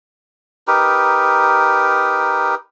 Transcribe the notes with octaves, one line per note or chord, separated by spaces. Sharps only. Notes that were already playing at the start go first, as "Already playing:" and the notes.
D#4 G4 A#4 B4